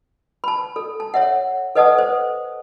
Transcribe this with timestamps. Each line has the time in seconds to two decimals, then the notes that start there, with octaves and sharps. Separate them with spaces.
0.44 A5 B5
0.76 A4
1.00 A5
1.14 C#5 E5 F#5
1.75 A4 B4 D#5 F#5 A5 D#6
1.98 C5